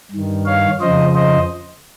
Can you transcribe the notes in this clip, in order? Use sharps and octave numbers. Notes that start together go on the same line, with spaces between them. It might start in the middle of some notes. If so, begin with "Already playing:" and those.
G2 D#3
C#5 F5
F2 C#3 F3 C5 D#5
C5 D#5